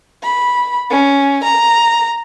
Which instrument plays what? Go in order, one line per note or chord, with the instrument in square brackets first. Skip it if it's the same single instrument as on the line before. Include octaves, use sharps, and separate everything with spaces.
[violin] B5
C#4
A#5